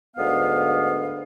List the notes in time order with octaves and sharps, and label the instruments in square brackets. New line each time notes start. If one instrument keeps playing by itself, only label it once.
[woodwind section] D2 G#2 B2 B3 F5